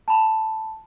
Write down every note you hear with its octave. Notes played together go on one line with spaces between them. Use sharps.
A5 B5